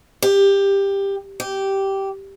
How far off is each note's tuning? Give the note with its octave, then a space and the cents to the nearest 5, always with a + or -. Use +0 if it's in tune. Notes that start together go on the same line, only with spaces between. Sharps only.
G4 +15
G4 -10